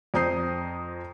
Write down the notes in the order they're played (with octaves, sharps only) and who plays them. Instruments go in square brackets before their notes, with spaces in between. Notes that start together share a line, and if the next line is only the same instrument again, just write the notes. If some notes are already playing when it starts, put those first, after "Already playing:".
[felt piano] F2 C4 A#5 D#6 G6 C7